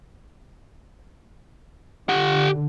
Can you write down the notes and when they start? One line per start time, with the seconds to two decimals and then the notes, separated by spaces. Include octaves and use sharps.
2.09 D3 G4 F#5